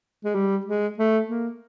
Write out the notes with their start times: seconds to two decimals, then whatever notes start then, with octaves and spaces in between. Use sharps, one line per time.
0.24 G#3
0.34 G3
0.65 G#3
0.98 A3
1.28 A#3